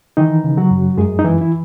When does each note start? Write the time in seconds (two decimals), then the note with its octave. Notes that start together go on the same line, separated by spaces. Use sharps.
0.17 D#3 E3 D#4
0.44 C#3
0.57 F#3 F#4
0.70 F#2
0.97 F#2 G#3 G#4
1.19 D#4
1.25 E3 E4
1.41 E4